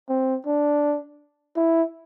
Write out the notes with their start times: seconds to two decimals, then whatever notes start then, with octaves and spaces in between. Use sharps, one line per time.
0.09 C4
0.46 D4
1.57 E4